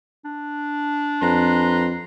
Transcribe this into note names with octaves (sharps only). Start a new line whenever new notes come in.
D4
F2 B4 A#5 C6